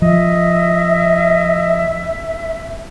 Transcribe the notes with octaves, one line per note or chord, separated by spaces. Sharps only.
F3 D#5 E5